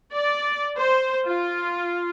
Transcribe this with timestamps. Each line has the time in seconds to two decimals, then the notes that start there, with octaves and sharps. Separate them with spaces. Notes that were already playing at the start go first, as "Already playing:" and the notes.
0.13 D5
0.76 C5
1.27 F4